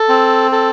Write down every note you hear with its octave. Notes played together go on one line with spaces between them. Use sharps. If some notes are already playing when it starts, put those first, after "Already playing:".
Already playing: A4
C4
A4